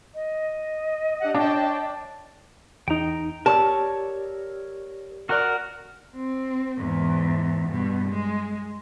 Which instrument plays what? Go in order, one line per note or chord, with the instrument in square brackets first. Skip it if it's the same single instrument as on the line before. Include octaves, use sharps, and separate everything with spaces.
[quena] D#5
[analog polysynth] D4 G4 F#5
[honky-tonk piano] D4 [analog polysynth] C#5 G5 A5
[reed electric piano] E2 D#4 [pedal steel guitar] G5 A#5
[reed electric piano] G4 D5 [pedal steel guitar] A#4 C#5 E6 [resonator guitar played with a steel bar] A5
[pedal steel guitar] F#4 F#5 F#6 [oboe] A#4 [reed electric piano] D5 F6
[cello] C4
E2 G#2
G2 B2
G#3